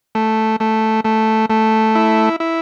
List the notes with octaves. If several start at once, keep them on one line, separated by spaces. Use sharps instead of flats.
A3
A3
A3
A3
E4
E4